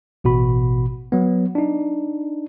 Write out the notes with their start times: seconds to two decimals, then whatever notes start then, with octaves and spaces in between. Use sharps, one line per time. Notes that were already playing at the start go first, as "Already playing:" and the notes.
0.24 A1 B2 F#4 B5
1.12 F#3 B3
1.55 D4 D#4